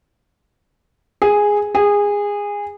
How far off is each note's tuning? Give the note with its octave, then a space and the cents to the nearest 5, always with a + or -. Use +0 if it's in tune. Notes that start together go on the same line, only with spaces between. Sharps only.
G#4 -5
G#4 -20